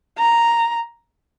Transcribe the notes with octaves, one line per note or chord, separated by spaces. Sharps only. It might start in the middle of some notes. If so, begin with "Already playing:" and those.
A#5